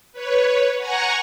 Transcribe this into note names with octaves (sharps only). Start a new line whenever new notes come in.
B4 C#5
F#5 G#5 A#5 C#6